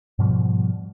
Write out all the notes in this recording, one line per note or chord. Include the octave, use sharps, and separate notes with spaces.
G#2 B2 F3 G3